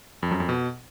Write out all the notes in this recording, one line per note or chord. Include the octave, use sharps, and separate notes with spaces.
F2
F#2
F2
B2